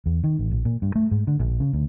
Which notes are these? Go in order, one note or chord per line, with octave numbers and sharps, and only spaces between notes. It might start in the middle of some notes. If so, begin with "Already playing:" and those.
E2
D#3
A1
A#1
A#2
G2
A3
G#2
D3
A#1
C#3
D2